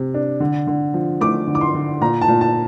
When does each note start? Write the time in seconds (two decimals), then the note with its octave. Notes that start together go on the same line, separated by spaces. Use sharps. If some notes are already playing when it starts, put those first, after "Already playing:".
Already playing: C3
0.14 D4
0.40 D3
0.67 D3
0.94 F3
1.21 A3 D6
1.47 D3
1.55 D6
1.61 C6
1.75 D3
2.01 A#2 A#5
2.21 A5
2.28 A#2
2.41 A5